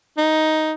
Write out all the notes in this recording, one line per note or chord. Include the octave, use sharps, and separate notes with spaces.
D#4